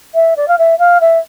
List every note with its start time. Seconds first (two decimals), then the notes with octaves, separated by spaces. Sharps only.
0.14 E5
0.36 D5
0.48 F5
0.58 E5
0.78 F5
1.01 E5